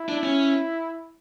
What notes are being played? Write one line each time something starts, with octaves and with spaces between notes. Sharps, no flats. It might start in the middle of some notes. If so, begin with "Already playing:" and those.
Already playing: E4
D4
C#4